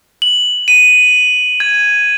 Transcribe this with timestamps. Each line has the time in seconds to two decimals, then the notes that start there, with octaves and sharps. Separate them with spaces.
0.22 F#7
0.68 D#7
1.60 G#6